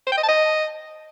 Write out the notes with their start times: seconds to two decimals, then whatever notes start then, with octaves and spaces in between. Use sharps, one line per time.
0.07 C5
0.12 G5
0.18 D#5
0.23 A5
0.29 D#5